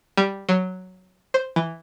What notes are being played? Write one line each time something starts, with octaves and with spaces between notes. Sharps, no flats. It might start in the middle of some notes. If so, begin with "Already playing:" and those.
G3
F#3
C5
E3